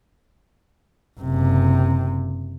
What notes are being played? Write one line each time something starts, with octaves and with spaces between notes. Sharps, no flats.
F#1 C3